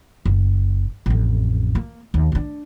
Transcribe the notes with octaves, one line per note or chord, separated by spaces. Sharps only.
F#1
A1 F2
A#3
D#2
C4 D4